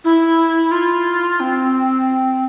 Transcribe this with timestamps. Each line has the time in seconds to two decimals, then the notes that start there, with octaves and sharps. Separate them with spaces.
0.04 E4
0.71 F4
1.40 C4